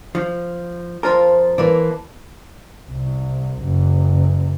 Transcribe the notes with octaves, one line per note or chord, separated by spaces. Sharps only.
F3
F2 F4 A#4 C5 A5
E3 A#3 D5
C2
F#1